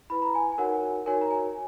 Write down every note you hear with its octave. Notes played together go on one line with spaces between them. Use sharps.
E4 B4 B5
A#5
G#5
G#5
D#4 F#4 A#4 C#5 F#5
D#4 F#4 A#4 C#5 G#5
A#5
G#5